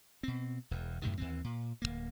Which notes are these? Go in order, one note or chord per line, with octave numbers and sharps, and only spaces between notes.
B2 C4
E1 E2
F#2 A2 C3 D#3
D#2 E3 C4
A#2
D1 F2 A#3